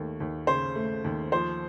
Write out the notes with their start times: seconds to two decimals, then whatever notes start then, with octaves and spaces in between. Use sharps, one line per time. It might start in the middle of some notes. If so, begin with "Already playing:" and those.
Already playing: D#2 A3
0.20 D#2
0.47 C#3 C5
0.75 A3
1.04 D#2
1.32 F3 C5